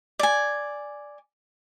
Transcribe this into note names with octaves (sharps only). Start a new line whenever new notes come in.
D5 G#5